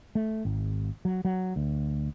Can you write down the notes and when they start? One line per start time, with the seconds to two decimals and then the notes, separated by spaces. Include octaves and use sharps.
0.15 A3
0.45 G#1
1.05 F#3
1.25 F#3
1.56 D2